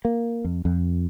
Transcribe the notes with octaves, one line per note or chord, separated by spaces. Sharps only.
A#3
F2
F2